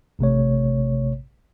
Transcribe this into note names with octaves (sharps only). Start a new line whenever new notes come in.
A1 C3 A3 C#5